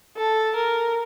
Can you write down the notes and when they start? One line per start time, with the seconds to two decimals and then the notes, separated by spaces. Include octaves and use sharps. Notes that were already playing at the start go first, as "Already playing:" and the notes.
0.17 A4
0.56 A#4